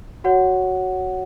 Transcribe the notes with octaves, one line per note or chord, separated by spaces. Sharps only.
F#4 C#5 F#5